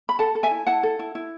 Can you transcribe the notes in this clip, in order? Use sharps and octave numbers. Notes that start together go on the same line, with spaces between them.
B5
A4 F#5 A5
A4
E5 G#5
E4
E4 F#5 A5
A4
E4
E4